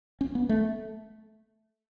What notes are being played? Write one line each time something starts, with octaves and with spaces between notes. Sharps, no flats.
C#4
B3
A3